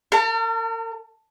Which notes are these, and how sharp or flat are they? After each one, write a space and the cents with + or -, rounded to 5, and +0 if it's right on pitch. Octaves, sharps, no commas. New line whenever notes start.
A#4 -40 A5 +35